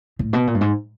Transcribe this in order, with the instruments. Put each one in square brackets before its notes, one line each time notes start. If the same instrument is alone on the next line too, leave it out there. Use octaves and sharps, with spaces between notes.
[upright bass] A2
B2
A#2
G2
G#2